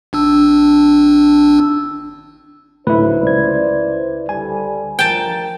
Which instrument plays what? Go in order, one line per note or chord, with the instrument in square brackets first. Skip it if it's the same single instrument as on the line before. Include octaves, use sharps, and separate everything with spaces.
[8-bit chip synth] G#1 D4 E6
[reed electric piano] D2 A2 [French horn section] F#3 D#4 C5 [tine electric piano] E4 B4
[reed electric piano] C#2 G#6 [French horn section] C5 D5
[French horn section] D3 G3 [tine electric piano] G#5
[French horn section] F3 A#4 [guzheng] G5 A5